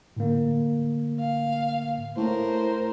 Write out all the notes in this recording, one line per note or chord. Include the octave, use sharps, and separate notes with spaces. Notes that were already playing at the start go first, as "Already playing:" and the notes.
A2 D3 A#3
F5
A2 A#4 C5